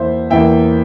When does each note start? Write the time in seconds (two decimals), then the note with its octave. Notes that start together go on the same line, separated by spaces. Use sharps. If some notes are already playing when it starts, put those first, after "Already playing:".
Already playing: E2 E3 A#3 C5 E5
0.30 E2 E3 A#3 E5 G5